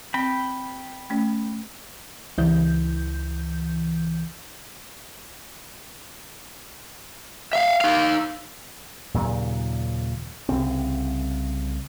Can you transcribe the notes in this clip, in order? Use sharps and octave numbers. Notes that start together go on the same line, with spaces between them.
C4 G5 B5
A3 C#4
C#2 E3 G6
E5 F5
D#4 F5
D#2 A#2 C#3 F#3
C2 C#3 C4